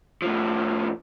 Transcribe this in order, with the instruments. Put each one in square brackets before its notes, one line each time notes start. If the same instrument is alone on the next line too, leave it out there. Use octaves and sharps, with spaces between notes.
[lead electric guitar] A2 F3